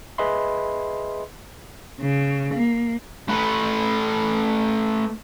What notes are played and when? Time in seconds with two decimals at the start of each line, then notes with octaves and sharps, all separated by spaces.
0.18 G#4 B4 D#5 E5 B5 C6
2.00 C#3
2.54 A#3
3.29 A3 B4